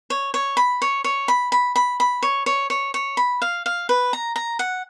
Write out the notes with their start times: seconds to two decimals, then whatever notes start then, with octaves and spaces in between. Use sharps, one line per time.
0.10 C#5
0.34 C#5
0.57 B5
0.82 C#5
1.04 C#5
1.28 B5
1.52 B5
1.76 B5
2.00 B5
2.23 C#5
2.46 C#5
2.70 C#5
2.94 C#5
3.17 B5
3.42 F5
3.66 F5
3.89 B4
4.13 A#5
4.36 A#5
4.59 F#5